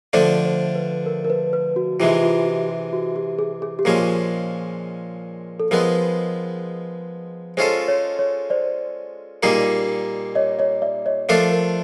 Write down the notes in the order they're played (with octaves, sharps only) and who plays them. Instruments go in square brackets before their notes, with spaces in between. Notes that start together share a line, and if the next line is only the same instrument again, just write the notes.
[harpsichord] D3 F3 A3 D4 [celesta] C5 D5
[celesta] C5
B4
A#4
A#4
B4
B4
F#4
[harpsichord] C3 E3 G#3 [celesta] F4
[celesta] F4
F#4
G4
F#4
G4
G#4
G#4
G4
[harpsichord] A#2 F3 G#3 C#4 [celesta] G#4
[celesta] A4
[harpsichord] F3 G#3 B3 [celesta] A#4
[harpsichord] G#3 C#4 F4 A4 [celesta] C5
[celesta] C#5
C#5
C5 D5
[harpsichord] A#2 G3 A#3 D#4 G#4
[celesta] C#5 D#5
C#5 D#5
D5 E5
C#5 D#5
[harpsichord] F3 A3 D4 F4 A4 [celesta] A#4
[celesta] A#4